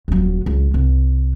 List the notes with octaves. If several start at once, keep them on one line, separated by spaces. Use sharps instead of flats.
D#1 F#3
C#2
C2